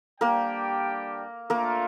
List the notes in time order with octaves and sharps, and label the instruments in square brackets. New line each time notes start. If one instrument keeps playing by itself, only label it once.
[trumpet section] G3 D4 G4 D5 G5 [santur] A#3 A#4
[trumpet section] A3 D4 F4 [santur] A#3 A#4